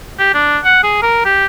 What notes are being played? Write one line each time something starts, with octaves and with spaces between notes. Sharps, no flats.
G4
D4
F#5
G#4
A#4
G4